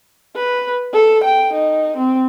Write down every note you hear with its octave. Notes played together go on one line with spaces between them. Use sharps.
B4
A4
G5
D#4
C4